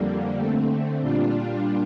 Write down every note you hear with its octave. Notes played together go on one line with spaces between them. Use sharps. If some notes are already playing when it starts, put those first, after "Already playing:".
Already playing: F2 D3 G3 A#3
D3 A3 C4
A#2 G3 D4 F4